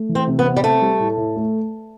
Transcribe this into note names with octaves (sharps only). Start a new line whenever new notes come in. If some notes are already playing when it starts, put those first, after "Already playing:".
Already playing: A3
E3
C4
C3
B3
C4
G3
A3 C4
G3
A2
A2
A3